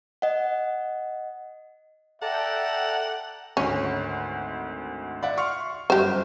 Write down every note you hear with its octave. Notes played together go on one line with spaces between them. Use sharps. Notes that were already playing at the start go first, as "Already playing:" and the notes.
D#5 F#5
A4 D5 E5 F#5 G5 A5 A#5
G#1 D2 C#4
D5 E5 F#5
C6 C#6 F6
G1 F#2 G4 C5